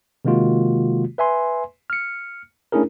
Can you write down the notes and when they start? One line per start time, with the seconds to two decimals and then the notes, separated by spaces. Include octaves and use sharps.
0.25 C3 D#3 G#3 A#3 F4 F#4
1.18 B4 E5 G#5 C6
1.90 F6 C#7
2.72 A3 C#4 D4 E4 G#4 A#4